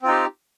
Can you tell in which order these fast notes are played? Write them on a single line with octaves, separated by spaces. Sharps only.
C4 F4 D#4 G4